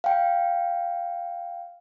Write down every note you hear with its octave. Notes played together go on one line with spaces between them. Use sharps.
F5 G5